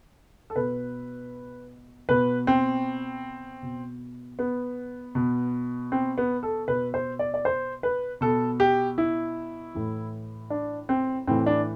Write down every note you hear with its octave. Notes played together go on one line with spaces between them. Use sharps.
A4
B2 B4
B2 B4
C4
B2
B3
B2
C4
B3
A4
B2 B4
C5
D5
D5
C5
B4
B2 A4
G4
E4
A2 E3
D4
C4
A2 E3 C4
D4